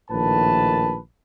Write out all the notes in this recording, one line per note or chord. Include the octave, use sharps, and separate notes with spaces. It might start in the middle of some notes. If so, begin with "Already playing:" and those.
A#1 A2 D#3 B4 A5